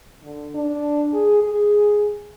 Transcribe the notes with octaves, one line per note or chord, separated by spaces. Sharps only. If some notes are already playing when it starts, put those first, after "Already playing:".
D3
D4
G#4
G#4